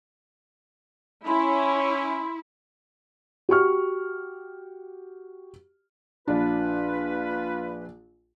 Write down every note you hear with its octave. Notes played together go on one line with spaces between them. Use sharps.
C#4 E4 B5 C6
F#4 G4 C#6 F6
A#1 D4 F4 B4